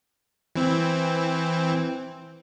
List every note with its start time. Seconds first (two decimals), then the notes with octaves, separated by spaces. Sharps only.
0.56 E3 C4